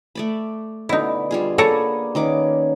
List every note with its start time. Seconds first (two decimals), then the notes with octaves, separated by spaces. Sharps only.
0.15 A3 D5 B5
0.89 B2 D3 D#4 E4 D6
1.31 G3 F4 G#4
1.58 A#3 G#4 A4 B4 C#5 A#5
2.15 D#3 A#3 C#4 D#4 B4 D6